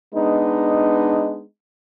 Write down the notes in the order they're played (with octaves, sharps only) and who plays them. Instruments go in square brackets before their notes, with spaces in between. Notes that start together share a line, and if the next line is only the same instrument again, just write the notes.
[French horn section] G#3 B3 D4 D#4